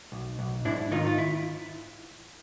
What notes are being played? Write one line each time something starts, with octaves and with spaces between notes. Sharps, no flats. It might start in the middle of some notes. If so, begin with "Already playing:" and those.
B1
B1
G#2 D4 E4
D#3 D#4 F4
F4
E4